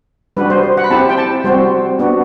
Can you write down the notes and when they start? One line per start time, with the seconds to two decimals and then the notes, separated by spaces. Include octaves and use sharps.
0.37 G3 D4 F#4 B4
0.50 C5
0.63 C5
0.77 F#5
0.84 B5
0.90 C4 E4 G4 A5
1.09 G5
1.18 A5
1.44 G3 C4 F#4 C5
1.99 B3 D4 F#4